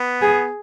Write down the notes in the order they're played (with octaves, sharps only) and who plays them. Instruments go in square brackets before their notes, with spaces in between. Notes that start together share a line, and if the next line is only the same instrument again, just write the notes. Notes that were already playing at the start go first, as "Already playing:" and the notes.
Already playing: [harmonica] B3
[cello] G#4